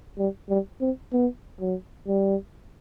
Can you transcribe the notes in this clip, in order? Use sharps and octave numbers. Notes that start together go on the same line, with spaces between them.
G3
G3
C4
B3
F#3
G3